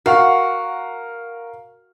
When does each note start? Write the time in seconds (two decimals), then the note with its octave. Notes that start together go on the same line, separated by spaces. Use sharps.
0.06 F#4 A#4 F5 F#5